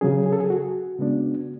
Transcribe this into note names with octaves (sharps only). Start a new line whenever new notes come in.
C#3 F#3 C#4 G#4
G#4
A4
G#4
F#4
C#3 G#3 B3 D4